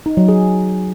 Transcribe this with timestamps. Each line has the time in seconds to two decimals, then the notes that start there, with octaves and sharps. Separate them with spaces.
0.06 D#4
0.17 F#3
0.28 G#4